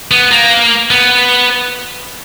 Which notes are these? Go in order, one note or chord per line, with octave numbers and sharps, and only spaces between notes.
B3
A#3
B3